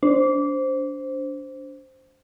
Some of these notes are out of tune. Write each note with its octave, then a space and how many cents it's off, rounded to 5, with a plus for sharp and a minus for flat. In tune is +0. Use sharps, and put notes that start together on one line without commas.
D4 -25 C5 +0